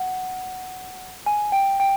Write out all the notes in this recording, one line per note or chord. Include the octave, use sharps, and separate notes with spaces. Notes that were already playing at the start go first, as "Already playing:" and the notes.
Already playing: F#5
G#5
G5
G5